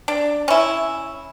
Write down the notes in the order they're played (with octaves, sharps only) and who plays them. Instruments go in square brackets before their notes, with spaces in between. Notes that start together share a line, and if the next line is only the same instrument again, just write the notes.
[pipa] D4
C#4 E4